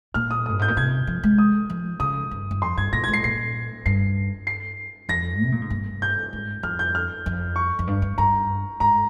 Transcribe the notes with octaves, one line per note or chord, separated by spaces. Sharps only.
A#2 F6
D#6
G2 D#6
G#2 G6
A#2
C3 G#6
F3
G#3
D#6
F3
C#3 D#6
G2
G2
F2 C6
G2 G#6
A#2 A#6
G#6
G#2
C7
A#2 C7
G2 C7
C7
F2 A#6
C3
A#2
G#2
G2
G6
G#2
F2 F6
G6
F6
F2
C#6
F2
G2
G2
G2 A#5
G#2 A#5